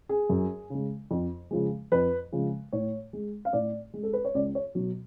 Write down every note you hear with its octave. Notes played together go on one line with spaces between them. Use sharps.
G#4
F#2
C#3 G#3
F2
C#3 F3 G#3
F2 B4
C#3 F3 G#3
A2 C#5
G#3
F5
A2 D5
G#3
A4
B4
C#5
C#2 D5
C#5
B2 F#3